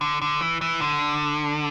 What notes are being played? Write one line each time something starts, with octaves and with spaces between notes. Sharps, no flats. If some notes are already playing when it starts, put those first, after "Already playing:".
D3
D3
E3
E3
D3